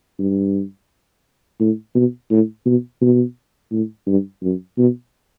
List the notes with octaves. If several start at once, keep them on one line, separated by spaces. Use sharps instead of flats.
G2
A2
B2
A2
B2
B2
A2
G2
F#2
B2